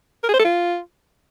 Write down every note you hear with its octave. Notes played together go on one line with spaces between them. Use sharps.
A#4
G#4
C5
A4
F4